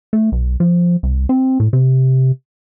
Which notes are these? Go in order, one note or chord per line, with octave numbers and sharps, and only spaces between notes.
A3
B1
F3
C2
C4
A2
C3